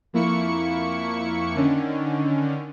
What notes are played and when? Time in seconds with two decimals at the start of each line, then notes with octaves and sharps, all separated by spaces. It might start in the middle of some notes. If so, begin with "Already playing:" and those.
0.13 F2 A#3 E4 C#6 C#7
1.55 D3 D#3 C#4